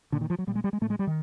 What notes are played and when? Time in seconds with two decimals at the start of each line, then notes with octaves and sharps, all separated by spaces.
0.12 A#2 D3
0.21 D#3
0.30 F3
0.39 F#3
0.47 A#2 G3
0.55 G#3
0.64 G3
0.73 G#3
0.81 A2 A3
0.90 G#3
0.99 G3
1.07 D#3